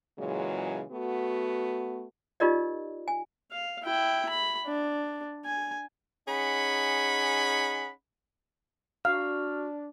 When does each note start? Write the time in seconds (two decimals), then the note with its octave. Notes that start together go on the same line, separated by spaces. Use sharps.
0.19 A#2 C#3 E3 F#3 G#3
0.91 A3 B3 F#4
2.40 D#4 F4 G4 A#4 D5 D#5
3.08 G#5
3.52 F5
3.83 E4 G5
4.29 B5
4.66 D4
5.45 G#5
6.28 C#4 D#4 G#4 F#5 B5
9.05 D4 F#4 F5 F6